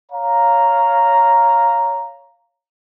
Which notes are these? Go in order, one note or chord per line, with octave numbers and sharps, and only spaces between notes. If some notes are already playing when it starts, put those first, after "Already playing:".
C#5 F5 A#5